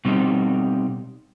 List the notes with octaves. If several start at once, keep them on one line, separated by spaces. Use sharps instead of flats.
B2 G3 C4 D#4